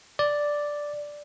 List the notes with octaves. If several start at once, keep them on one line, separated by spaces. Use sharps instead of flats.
D5